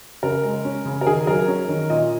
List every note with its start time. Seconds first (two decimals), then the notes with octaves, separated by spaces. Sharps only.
0.23 C#3 A#4
0.44 G#3
0.65 C#4
0.85 C#3
1.01 A#4
1.06 D#3 G#4
1.27 F#3 A#4
1.48 C#4
1.69 D#3
1.89 A#2 D#5